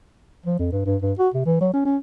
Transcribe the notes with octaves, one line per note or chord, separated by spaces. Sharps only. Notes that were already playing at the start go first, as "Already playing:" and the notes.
F3
F2
G2
G2
G2
F#4
C3
E3
F#3
C#4
C#4